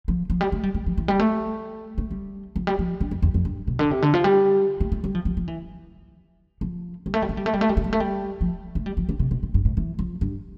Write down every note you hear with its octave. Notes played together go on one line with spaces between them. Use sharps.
F3
F3
G3
A3
G3
G3
F3
E3
G3
A3
A3
G3
F3
G3
F3
D3
F2
E2
F2
G2
B2
D3
C3
D3
F3
G3
A3
A3
G3
F3
F3
F3
E3
F3
G3
A3
G3
A3
G3
A3
G3
A3
G3
A3
G3
A3
G3
F3
A3
G3
F3
D3
C3
B2
A2
G2
A2
E3
F3
G2